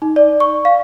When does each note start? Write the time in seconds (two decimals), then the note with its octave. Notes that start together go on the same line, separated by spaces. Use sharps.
0.02 D#4
0.16 D5
0.40 C#6
0.65 F5